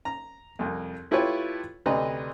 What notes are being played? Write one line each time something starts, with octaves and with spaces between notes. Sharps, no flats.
A#5
C2 F2
A3 E4 F4 G4 B4 C#5
D2 C3 D4 B4 D#5 A#5